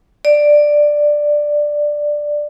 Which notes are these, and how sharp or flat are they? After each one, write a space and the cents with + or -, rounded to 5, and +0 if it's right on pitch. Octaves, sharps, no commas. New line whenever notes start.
D5 +5